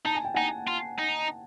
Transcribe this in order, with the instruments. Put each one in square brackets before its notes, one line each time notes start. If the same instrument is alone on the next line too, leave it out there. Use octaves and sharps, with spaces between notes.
[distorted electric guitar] D#4 [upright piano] A5
[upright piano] G#5
G5
[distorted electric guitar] D#4 [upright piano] F#5 G#5
[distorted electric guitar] F4
D#4